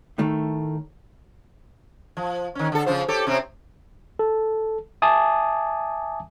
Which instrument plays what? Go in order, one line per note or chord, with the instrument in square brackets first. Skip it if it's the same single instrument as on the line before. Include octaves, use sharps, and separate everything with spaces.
[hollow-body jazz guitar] A2 D#3 A3
[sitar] F3
D#3 C#4
D3 A4
C#3 F3 C5
G4 A4 C#5
C3 C4 C#4
[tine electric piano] A4
E5 G#5 A5 D6 D#6